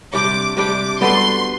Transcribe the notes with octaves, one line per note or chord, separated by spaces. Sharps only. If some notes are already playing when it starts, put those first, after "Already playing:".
C3 G3 D4 G4 D6
C3 G3 D4 G4 D6
G3 B3 F#4 A4 C6